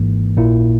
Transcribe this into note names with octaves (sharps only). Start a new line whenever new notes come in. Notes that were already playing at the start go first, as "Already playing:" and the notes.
Already playing: G#1 G#2 E3 A#3
A#1 A#2 A#3 E4